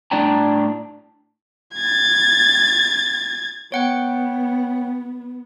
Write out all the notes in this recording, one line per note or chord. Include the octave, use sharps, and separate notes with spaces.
A2 D4 D5 G5 A5 A#5
G#6 A6
B3 C#5 F#5 G5